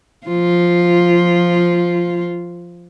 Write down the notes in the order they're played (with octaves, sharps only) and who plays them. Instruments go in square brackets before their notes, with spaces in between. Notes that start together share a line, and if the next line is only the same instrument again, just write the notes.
[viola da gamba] F3 F4